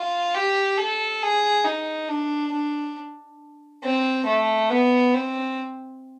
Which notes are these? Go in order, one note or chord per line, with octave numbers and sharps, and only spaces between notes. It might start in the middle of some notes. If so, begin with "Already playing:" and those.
Already playing: F4
G4
A4
G#4
D#4
D4
D4
C4
A3
B3
C4